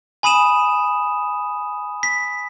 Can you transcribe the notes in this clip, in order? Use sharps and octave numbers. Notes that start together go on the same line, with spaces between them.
G#5 B5 D#6 D#7 E7
B6